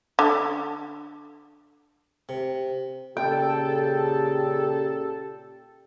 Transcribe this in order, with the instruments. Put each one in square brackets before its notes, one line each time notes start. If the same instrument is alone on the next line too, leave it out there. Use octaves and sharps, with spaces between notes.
[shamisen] D3
[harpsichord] C3
[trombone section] A#2 A4 [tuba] C#3 [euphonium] G4 [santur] G5